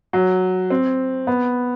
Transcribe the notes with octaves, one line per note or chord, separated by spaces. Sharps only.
F#3
C4
B3